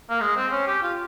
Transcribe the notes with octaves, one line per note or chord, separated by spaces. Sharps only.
A#3
G#3
C4
C#4
G4
F4